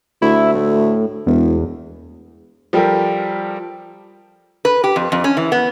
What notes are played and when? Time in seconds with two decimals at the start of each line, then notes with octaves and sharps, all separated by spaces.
0.22 D2 E4
0.55 A2
1.26 E1 E2
2.73 F3 G3 G4 A4 A#4
4.65 B4
4.84 G4
4.96 F2
5.12 F2
5.24 C#4
5.37 E3
5.52 B3